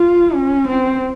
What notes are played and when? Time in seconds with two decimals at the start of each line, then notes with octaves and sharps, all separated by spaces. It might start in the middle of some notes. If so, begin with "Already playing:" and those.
Already playing: F4
0.33 C#4
0.68 C4